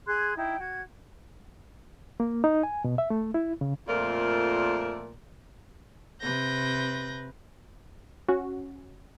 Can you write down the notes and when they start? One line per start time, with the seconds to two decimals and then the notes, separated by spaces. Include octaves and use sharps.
0.07 G#4 C6 F#6 G#6
0.37 D#4 E4 G5
0.59 F#4 G#6
2.20 A#3
2.44 D#4
2.63 G#5
2.84 B2
2.98 E5
3.10 A3
3.34 E4
3.61 C#3
3.88 F2 A#2 A3 F4 A#4 D5
6.21 C3 B4 G6 A#6
8.28 C#4 F#4